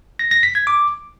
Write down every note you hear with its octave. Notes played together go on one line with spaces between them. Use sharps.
A#6
A#6
B6
G#6
D6